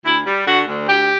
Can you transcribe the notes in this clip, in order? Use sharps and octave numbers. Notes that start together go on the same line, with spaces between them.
D2 E4
G3
D3 F#4
D2
D2 G4